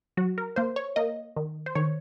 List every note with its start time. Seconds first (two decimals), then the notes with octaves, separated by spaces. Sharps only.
0.17 F#3 F#4
0.38 A#4
0.56 A#3 C5
0.76 C#5
0.96 A#3 D#5
1.36 D#3
1.66 C5
1.75 D#3 C#5